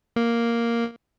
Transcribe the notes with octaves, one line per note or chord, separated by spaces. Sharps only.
A#3